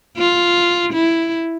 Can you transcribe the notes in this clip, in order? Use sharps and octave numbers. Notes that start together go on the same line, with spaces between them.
F4
E4